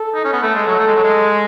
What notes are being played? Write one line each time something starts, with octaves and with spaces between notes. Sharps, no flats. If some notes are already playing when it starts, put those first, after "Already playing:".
Already playing: A4
D#4
C#4
B3
A3 A4
G#3
F#3
A3
G#3
F#3
G#3